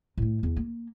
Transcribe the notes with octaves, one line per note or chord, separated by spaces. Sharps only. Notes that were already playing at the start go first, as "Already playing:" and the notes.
A2 A3
E2
A#3